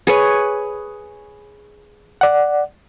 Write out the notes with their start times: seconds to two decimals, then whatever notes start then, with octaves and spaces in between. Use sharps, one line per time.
0.07 G#4 B4 C#5
2.21 D5 F#5